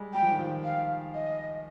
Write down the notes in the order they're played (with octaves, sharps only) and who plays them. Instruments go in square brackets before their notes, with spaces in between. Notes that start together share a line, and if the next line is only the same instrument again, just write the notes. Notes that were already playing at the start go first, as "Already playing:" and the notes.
Already playing: [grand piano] G3 G#3
[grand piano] G3 [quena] G5
[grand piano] F3
D#3
F3
[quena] F5
D#5